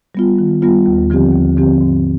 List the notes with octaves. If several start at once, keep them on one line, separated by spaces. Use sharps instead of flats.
G3 B3 F4
D#3
G3 B3 F4
D#2
D3 F3 C4 G4
D#2
D3 F3 C4 G4
G#2